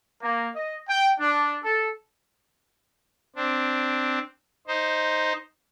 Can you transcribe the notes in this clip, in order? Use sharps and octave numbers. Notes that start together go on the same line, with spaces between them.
A#3
D#5
G5
D4
A4
C4 D4
D#4 C5